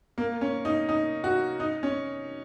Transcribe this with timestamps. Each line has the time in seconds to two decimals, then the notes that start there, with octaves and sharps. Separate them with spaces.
0.18 A#3
0.41 C#4
0.65 D#4
0.89 D#4
1.24 F#4
1.60 D#4
1.83 C#4